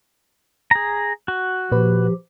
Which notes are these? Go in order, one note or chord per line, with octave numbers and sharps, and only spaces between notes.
G#4 A#5
F#4
A#2 F3 G4 B4